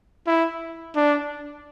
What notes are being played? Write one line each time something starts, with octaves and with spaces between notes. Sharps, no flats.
E4
D4